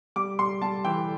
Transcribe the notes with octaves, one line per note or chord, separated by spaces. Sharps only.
G3 D6
G3 C6
G3 A5
E3 G5